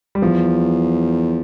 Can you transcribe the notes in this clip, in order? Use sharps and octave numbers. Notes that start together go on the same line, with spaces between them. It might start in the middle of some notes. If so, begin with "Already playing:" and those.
G3
E2 F3